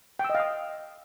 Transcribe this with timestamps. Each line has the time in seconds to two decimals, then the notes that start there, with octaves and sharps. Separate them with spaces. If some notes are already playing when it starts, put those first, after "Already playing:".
0.19 G5
0.24 E6
0.30 D#5
0.35 F5
0.40 D#6